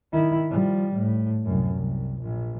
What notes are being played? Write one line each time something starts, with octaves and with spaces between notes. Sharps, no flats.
D#3 E4
F3 G3
A2
C2 F#2
C2
A#1